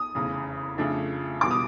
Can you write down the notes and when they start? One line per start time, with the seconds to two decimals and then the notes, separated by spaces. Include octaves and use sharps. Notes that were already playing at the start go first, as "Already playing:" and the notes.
Already playing: D#6
0.15 F1 E2 C#3
0.78 F2 C#3 F3 A3 D4
1.41 E1 E2 B2 G3 B3 D6
1.51 D#6